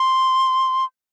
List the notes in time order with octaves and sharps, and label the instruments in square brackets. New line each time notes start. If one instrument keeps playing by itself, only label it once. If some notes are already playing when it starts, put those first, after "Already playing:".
Already playing: [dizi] C6